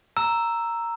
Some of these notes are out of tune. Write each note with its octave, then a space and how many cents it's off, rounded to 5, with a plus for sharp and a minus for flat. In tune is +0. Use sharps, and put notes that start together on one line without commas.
A#5 -5 E6 +5